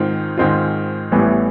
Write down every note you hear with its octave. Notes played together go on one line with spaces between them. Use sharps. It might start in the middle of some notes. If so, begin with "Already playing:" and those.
Already playing: G#2 D#3 G#3 C4 F4
G#2 D#3 G#3 C4 F4
A1 A2 E3 G3 B3